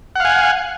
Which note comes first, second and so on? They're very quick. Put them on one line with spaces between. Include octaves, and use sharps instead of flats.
F#5 F5 G#5